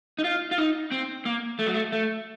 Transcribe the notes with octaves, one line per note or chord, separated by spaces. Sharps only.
D#4
F4
F4
D#4
C4
A#3
A3
F#3
A3
A3